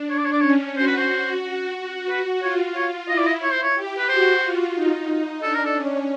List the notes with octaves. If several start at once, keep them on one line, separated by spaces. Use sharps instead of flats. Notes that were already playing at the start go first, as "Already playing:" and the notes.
Already playing: D4
C#5
D5
C#5
D5
C#4 C#5
F#4 C5
B4
C5
F#4
F#4
F#4
F#4 B4
F4 C#5
C#5
E4 D#5
D5
D#5
C#5
C5
C#5
G4
B4
F#4 C5
F4
D#4
D4 A4
A#4
A4
C#4